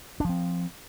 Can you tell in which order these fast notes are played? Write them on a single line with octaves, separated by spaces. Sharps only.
D4 F3 C4